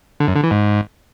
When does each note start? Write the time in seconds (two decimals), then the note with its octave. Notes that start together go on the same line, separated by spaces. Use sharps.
0.20 D3
0.28 F#2
0.36 D3
0.43 E3
0.51 G#2